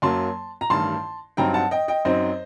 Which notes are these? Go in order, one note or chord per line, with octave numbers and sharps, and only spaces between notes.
F#2 F#3 A#3 A5 C6
A#5
A1 G2 D#3 A5 C6
G2 F#3 C4 D#4 G5 A#5
F#5 A5
D#5 G5
D#5 G5
F#2 F#3 C4 D#4 C5 D#5